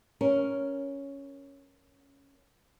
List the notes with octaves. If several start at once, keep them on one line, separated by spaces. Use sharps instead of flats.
C#4 A#4